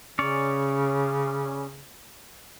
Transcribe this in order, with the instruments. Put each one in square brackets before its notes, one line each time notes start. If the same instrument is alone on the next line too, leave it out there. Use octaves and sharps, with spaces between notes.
[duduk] C#3 [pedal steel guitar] C#4 C#5 D5